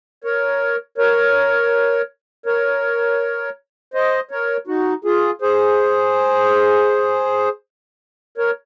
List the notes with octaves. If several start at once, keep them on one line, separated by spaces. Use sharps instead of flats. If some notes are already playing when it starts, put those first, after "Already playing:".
A#4 C#5
A#4 C#5
A#4 C#5
C5 D#5
A#4 C#5
D#4 F#4
F4 G#4
G#4 C5
A#4 C#5